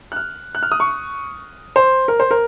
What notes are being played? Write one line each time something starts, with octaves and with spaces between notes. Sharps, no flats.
F#6
F6
F#6
F6
D#6
C#6
C5
A#4
C5
A#4